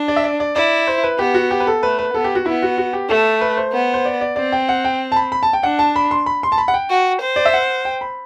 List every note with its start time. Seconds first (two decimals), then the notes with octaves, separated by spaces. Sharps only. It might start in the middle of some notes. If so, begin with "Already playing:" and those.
Already playing: D4
0.08 D5
0.16 E5
0.24 D5
0.40 D5
0.56 E4 D5
0.87 C5
1.03 B4
1.19 B3 G4
1.34 F#4
1.51 G4
1.60 B4
1.67 A4
1.83 A3 B4
1.99 B4
2.14 B3 A4
2.24 G4
2.35 F#4
2.46 B3 E4
2.62 F#4
2.78 F#4
2.93 G4
3.09 A3 A4
3.41 B4
3.57 C5
3.72 B3
3.94 C5
4.05 D5
4.21 D5
4.36 C4 D5
4.52 G5
4.69 F#5
4.85 G5
5.12 A5
5.16 B5
5.32 B5
5.43 A5
5.53 G5
5.63 D4 F#5
5.79 A5
5.96 B5
6.11 C6
6.26 B5
6.43 C6
6.52 A5
6.58 B5
6.68 F#5
6.74 G5
6.90 F#4
7.22 C5
7.36 D5
7.46 E5
7.53 F#5
7.85 G5
8.01 B5